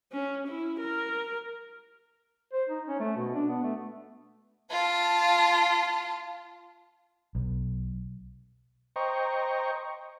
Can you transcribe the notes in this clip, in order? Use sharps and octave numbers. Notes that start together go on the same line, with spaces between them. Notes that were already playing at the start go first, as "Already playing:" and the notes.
C#4
E4
A#4
C5
D#4
C#4
A3
B2
D4
B3
A3
F4 A5
B1
C5 D#5 G5 A#5 C#6